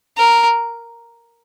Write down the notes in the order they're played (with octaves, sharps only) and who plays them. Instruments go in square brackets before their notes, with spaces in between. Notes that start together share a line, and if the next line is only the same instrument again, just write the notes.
[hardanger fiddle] A#4